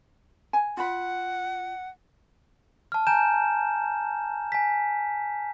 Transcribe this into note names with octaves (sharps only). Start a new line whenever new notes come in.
G#5
F4 F#5 B5
A5 F6
G#5 A#5 G6 E7
G#5 B6